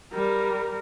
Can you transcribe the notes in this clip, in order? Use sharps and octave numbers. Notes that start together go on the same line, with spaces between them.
G3 A#4